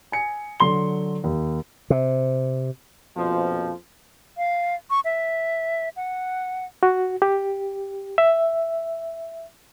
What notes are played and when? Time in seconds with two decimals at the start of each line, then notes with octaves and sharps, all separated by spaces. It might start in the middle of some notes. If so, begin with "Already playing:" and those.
0.12 G#5 C#7
0.60 D3 F#3 C6 G7
1.24 D#2
1.90 C3
3.16 A#1 F2 B2 F3 F4 C5
4.37 F5
4.90 C#6
5.05 E5
5.96 F#5
6.83 F#4
7.22 G4
8.18 E5